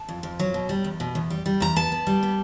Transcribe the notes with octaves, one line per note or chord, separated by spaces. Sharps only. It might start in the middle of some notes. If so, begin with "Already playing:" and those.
Already playing: A5
F2
F2
F#3
B2
G3
E2
B2
E2
G3
G3
E2 A#5
B3 A5
B3
G3
B3